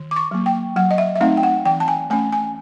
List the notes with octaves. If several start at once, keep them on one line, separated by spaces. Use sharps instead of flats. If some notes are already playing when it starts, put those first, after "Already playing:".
Already playing: D#3
D6
C#6
F#3 A#3
G5
F#3 F#5
D#5
E5
E5
A3 C4 D#4 F5
G5
F#5
E3 G5
A5
G#5
A3 C#4 G#5
G#5